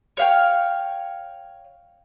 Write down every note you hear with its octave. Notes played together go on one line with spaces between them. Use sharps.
C#5 F5 G5